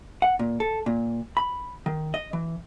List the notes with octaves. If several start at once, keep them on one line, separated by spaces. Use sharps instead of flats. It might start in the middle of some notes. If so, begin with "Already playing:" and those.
F#5
A#2
A4
A#2
B5
D#3
D#5
E3